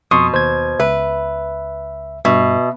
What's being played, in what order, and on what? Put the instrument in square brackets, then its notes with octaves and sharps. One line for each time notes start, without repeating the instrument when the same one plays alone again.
[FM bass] F2 [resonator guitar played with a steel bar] B2 [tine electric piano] C6 C#6 D#6
[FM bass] D#2 [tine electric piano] C5 G#6
[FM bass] C#2 [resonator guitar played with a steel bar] B4 [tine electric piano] E5
[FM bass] G2 [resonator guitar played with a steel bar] B2 [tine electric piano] E5